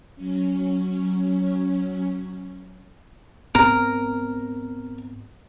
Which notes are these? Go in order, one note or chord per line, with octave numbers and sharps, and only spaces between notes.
F#3 C#4
G#2 B3 C4 A#4